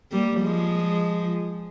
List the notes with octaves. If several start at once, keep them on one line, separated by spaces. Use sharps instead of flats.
G3 A#3
F3 G#3